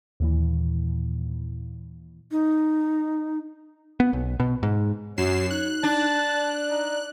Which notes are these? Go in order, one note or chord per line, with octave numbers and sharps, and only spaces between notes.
D#2 A#2 E3
D#4
B3
B1
B2
G#2
F#2 F#4 C#5 C7 E7
D#4 F#6
D4 A5
D5
D#4